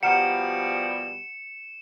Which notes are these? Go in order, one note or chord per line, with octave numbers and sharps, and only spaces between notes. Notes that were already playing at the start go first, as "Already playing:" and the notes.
B2 F3 G3 F#5 A#5 F6 C#7 E7